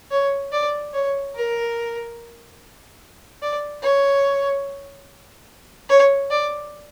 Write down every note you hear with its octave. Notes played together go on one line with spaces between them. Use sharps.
C#5
D5
C#5
A#4
D5
C#5
C#5
D5